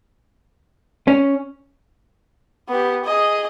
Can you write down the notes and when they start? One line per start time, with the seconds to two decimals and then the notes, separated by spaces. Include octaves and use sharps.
1.08 C#4
2.69 B3 G4
3.05 G#4 D#5